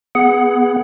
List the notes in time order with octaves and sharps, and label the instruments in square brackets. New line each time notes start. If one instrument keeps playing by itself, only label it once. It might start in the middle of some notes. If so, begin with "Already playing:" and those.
[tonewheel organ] B3 G#4 F#5